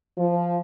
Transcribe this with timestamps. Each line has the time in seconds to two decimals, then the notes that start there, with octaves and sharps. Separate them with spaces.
0.18 F3